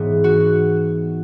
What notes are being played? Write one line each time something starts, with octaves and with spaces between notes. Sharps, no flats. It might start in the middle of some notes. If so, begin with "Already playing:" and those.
Already playing: G#2 E3 B3
F#4